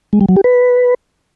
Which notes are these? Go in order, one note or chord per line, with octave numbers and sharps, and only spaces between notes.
G#3
G3
F#3
G4
B4